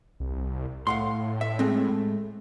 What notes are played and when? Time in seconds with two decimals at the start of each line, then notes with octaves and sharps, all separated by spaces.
0.20 C2
0.87 A2 F5 F#5 C6
1.41 E5
1.59 G#3 A3 C4